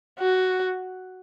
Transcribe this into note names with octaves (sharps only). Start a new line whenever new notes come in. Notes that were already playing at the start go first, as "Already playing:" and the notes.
F#4